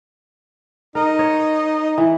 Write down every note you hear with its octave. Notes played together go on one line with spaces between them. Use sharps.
D#4 A#4
C#5
E3